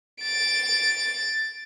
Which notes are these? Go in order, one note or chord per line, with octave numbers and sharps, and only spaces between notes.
A6 D7